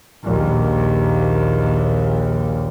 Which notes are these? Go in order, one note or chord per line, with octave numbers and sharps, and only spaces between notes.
A#1 D#2